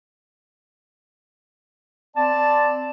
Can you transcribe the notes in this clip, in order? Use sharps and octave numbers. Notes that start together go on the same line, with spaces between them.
C4 D5 A5